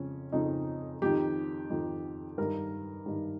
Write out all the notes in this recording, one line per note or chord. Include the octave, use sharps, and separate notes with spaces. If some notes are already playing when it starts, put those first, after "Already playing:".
Already playing: F2 C#3 C#4
F2 C#3 D#4
F2 D#3 G4
F2 D#3
G2 D#3 A#4
G2 D#3